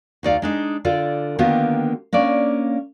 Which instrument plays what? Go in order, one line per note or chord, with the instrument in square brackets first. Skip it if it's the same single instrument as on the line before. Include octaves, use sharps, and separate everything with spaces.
[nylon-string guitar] D2 D#4 D5 F5
G#3 D4 D#4
D3 F4 A4 D5
D3 D#3 A#3 B3 F4 G4
A#3 C#4 D4 D5